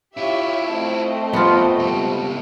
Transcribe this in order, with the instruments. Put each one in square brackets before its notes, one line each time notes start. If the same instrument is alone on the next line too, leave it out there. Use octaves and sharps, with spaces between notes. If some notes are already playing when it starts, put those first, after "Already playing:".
[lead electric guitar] E4 F4 [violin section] G4 C#5 E5
[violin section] A3 C4 D#5
[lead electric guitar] F2 [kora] B3 F4
[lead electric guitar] C#2 G3